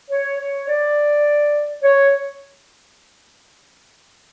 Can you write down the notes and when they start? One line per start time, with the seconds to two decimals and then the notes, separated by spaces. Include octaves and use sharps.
0.10 C#5
0.39 C#5
0.68 D5
1.83 C#5